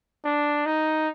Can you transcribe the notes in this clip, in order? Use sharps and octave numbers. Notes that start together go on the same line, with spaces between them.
D4
D#4